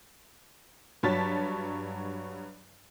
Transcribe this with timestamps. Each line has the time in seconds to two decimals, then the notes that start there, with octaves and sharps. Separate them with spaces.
1.03 G2 F#3 C#5 A5 A6 B6